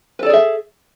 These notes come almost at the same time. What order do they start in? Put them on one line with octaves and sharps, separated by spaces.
B4 A4 D5 G#4 E5